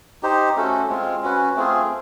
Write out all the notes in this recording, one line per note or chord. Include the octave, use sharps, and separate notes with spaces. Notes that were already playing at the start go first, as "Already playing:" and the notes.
D#4 G4 C5
A3 C#4 F#4 A4
G#3 C4 F4
C#4 F#4 B4
A3 C4 F4 G#4